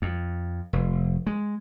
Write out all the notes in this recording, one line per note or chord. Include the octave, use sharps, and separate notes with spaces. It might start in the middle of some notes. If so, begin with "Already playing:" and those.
F2
F1
G#3